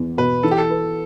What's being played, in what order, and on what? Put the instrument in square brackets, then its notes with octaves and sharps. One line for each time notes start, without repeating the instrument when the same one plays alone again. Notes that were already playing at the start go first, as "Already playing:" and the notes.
Already playing: [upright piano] E2
[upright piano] B2 [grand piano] B4
[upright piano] E3 [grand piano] A4
[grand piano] G4
A4
[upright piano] B4